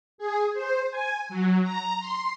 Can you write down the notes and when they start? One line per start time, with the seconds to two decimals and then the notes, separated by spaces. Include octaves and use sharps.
0.18 G#4
0.54 C5
0.91 G#5
1.29 F#3
1.62 A#5
1.99 C6